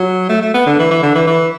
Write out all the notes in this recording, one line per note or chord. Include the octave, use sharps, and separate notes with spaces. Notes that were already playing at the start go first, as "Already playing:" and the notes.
Already playing: F#3
A3
A3
B3
D3
E3
E3
D3
E3
E3